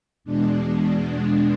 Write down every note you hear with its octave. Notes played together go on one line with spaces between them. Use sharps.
E2 B2 G#3 D4